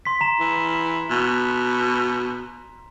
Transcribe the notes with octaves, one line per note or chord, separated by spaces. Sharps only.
C6 B6
A#5 E7
E3
B2